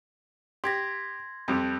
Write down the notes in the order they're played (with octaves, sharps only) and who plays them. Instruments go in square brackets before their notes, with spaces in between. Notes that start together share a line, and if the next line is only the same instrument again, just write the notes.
[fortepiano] G4 [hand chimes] C6 G#6 A#6
[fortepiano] F2 G3